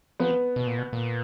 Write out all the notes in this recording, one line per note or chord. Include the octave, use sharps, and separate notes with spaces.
F3 B3
B2
A#2
B2
A#2